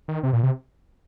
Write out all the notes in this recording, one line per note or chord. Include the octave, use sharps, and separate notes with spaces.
D#3
C3
A#2
C3